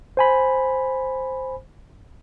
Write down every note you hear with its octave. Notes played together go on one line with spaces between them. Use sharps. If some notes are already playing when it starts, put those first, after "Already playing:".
C5 G#5 B5